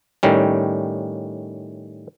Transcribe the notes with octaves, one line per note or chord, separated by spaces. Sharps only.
A2 D#3 G3 C#4